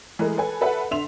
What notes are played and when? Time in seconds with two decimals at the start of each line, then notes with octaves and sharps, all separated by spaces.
0.19 E3 G#3 A3 G#4 A#4
0.38 A4 B4 G#5
0.61 A4 B4 E5 F#5
0.91 D3 E5 C6 F7